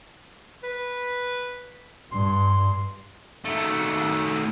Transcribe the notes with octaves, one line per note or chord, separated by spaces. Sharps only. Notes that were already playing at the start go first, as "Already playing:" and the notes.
B4
G2 C6
D#3 A3